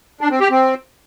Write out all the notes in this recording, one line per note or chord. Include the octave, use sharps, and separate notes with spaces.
D4
C4
G4
C4